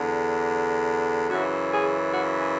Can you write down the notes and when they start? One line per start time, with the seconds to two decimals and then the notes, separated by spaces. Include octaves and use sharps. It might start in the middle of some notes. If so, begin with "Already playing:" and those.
Already playing: E2 D3
1.29 F#2 C#3 E3 F#4
1.71 G#4
2.13 F#4
2.40 G#4